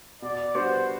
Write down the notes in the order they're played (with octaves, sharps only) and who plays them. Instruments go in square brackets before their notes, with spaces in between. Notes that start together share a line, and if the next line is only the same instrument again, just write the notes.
[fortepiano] B2 [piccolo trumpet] D5
[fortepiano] G3 B3 D4 F#4 [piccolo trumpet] C5